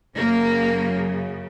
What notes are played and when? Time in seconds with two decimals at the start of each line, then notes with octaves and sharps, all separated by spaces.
0.16 F#2 C#3 F#3 A#3